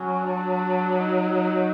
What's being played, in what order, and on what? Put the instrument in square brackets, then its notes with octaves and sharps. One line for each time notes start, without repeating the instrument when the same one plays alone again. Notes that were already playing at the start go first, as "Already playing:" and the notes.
Already playing: [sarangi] F#3 [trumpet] C#4
[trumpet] D4
D#4